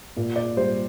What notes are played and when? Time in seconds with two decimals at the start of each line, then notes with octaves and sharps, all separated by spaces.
0.17 A#2
0.36 D5
0.57 G3 C5